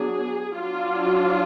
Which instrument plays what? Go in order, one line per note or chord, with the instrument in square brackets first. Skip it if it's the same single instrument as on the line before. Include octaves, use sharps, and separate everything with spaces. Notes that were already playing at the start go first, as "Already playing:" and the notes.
Already playing: [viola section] F#3 B3 D4 G#4
F#3 D4 F4